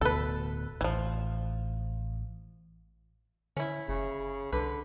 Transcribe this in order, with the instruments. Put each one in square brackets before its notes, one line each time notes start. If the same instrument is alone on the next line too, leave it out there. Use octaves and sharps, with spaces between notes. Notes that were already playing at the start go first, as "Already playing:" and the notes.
[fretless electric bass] D1 D2 B2 [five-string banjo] A4 B4
[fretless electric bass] A1 [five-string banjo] E3 F3
[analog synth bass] D3 [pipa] C#4 E4
[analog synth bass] F#1 [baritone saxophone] C#3
[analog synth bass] C2 [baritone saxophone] D3 [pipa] B4